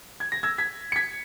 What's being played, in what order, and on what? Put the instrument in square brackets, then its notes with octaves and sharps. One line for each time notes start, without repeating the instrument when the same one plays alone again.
[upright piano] G#6
A#6
E6 G#6
G#6 B6
C#7
G#6 B6